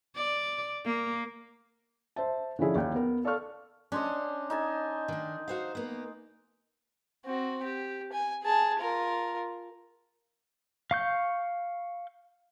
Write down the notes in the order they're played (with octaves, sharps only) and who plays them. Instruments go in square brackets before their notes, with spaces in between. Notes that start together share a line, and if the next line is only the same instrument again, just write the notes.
[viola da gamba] D5
A#3
[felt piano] C5 E5 A5
D3 F3 C#4 E4 G#4
D#2 G5
B3 A#4
A4 D5 F5 A5 C#6 F6
[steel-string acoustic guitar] C#4 [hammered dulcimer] D4 C5 D#5
[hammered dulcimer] D#4 G#5 A5
[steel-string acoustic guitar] D#3 D4
F#4 C5 F5
A#3 B3
[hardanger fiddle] C4 F#4
G4
G#5
G#4 A5
F4 A#4
[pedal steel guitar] F5 C#6 G6